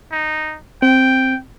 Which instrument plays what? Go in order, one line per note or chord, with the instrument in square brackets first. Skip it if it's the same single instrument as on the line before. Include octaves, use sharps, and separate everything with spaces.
[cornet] D#4
[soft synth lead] C4 [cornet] G5